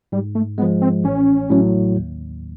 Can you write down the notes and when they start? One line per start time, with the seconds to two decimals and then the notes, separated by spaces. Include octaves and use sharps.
0.12 G#2 G3
0.35 A3
0.58 G#3 B3
0.62 F3
0.82 C4
1.04 A1 C#4
1.50 A2 F#3
1.96 D#2